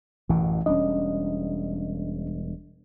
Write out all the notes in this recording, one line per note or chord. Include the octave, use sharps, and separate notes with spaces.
A1 F#2 B2 E3
E1 G3 C#4 D4 D#5